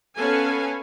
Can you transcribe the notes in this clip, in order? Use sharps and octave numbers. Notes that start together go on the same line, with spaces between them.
B3 C#4 A4 B4 F5 G#5